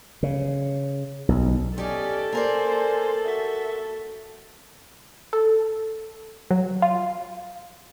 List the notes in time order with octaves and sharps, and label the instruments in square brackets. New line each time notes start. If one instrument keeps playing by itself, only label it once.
[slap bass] C#3
B1
[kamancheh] C#4 D5 [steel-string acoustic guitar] D#4 G4 [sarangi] A4
[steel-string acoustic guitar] A#3 A#4 D5 [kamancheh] C5 G#5
[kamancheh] F#4 E5
[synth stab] A4
F#3
F4